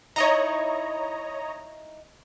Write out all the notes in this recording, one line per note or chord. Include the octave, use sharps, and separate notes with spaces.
D#4 E4 C#5 D#5 A#5